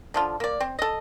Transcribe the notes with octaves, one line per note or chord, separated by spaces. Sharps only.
D3 F3 F4
A#3 D5
C4
A4 D#5